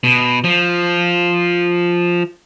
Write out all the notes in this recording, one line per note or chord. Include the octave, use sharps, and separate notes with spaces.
B2
F3